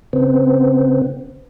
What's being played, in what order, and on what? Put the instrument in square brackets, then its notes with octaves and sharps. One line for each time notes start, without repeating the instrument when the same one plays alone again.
[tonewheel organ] C#3 B3 C4